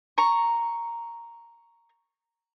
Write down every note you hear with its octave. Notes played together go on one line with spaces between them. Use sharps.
A#5 C#6